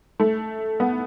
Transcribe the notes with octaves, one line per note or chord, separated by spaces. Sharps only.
A3
B3